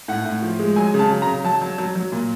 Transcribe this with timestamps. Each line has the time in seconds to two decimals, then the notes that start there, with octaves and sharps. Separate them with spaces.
0.08 A2 F#5
0.25 A2
0.42 F3
0.59 G#3
0.76 F#3 G#5
0.94 C#3
0.99 A5
1.11 F#3
1.22 A#5
1.27 C#3
1.44 F#3 A5
1.61 F#3
1.78 F#3
1.95 F#3
2.12 A#2